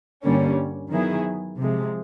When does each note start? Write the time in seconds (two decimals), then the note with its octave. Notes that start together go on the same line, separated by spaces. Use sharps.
0.23 G2 D3 G3 A#3 C#4
0.91 D#3 F#3 B3 E4 G#4
1.60 C3 F3 G#3